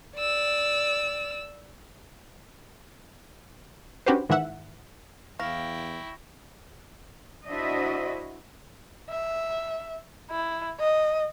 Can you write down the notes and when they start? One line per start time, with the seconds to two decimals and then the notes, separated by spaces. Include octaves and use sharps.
0.16 D5 E6
4.06 C#4 D4 F#4 G4 B4 C5
4.29 G#2 D#3 E3 E5 F#5
5.39 E2 E4 F5 G5 C#6 A#6
7.46 D4 E4 F#4 C5 D#5 E5
9.10 E5
10.31 E4
10.80 D#5